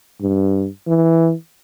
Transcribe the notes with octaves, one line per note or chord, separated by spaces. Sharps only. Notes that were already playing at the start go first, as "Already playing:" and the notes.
G2
E3